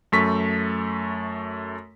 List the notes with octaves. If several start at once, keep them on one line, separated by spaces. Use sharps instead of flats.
F#2 A3 C#6 B6